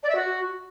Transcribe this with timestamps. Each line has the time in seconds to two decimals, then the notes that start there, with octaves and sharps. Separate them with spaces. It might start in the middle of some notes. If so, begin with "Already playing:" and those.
0.03 D5
0.09 E5
0.14 F#4